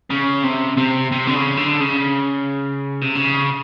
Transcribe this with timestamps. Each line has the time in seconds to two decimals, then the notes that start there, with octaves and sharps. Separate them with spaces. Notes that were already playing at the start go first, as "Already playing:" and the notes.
0.10 C#3
0.44 C3
0.78 C3
1.12 C3
1.27 D3
1.35 C#3
1.57 D3
1.80 C#3
3.02 C3
3.16 C#3